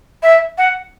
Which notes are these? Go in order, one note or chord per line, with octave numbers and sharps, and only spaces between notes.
E5
F#5